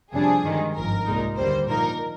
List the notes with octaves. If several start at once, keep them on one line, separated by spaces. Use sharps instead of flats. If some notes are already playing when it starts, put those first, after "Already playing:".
F2 C3 G3 D4 G#4
G2 D#3 G#3
G#1 G2 F3 A#4
C2 A#2 G#3 D#4
D#2 D3 G3 A#3 C5
A#2 F3 A#3 D#4 A#4